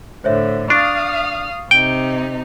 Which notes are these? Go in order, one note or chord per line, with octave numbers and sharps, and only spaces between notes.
A2 D3 C5 C#5 E5
D4 F5 C#6 D#6 F6 A6
C3 D#4 G5